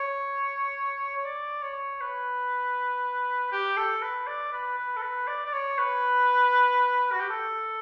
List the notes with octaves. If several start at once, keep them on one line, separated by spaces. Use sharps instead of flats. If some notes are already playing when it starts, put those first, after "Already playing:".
Already playing: C#5
C#5
D5
C#5
B4
G4
A4
B4
D5
B4
B4
A4
B4
D5
D5
C#5
B4
F#4
G4
A4